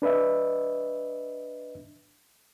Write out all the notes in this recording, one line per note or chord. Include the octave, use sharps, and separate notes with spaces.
D4 B4 D#5 E5